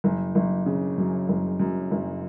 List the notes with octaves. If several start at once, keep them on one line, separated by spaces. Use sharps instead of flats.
F#1
F#1
C#3
F#2
F#1
F#2
F#1